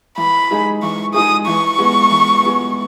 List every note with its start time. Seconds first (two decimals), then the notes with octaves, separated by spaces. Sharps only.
0.18 E3 B5
0.51 G#3 D#4 G#4
0.83 E3 C#6
1.14 G#3 D#4 G#4 D#6
1.47 E3 C#6
1.78 G#3 B3
2.11 E3
2.43 G#3 B3